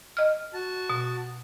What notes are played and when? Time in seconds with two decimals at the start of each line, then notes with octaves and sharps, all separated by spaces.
0.17 D#5 F6
0.54 F#4 A5
0.90 B2